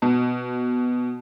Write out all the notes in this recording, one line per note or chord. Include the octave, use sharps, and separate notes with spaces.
B2